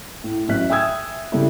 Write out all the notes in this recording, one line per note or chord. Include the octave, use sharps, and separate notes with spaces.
A2
A1 F#3 E5 F#6 B6
E5 G5 G#5 D#6 E6 G#6
C#3 G3 A3 E4